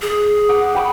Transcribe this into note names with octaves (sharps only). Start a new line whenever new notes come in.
G#4
F#5 D6
G5 B5 C#6